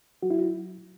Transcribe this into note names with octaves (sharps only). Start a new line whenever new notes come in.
F#3 F#4
E4